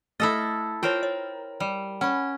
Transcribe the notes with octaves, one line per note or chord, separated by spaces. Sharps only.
A3 E4 A4 D#5 F6 A6
F4 A#4 C5 C#5 G5
C#5
G3
C#4 F#5 G#5 B5